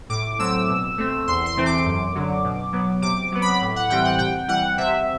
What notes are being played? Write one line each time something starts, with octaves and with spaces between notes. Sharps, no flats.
A2 D6
F#3 A3 C4 E6
B2
A3 C4
E2 C6
C6
C3 E3 A3 C4
D6
F#2
D3 F#3
B2
F#3 B3
C3 D6
F#3 B3
B5
A2
F#5
E3 G3 C4 G5
F#5
C3 G5
E3 G3 F#5
C3 E5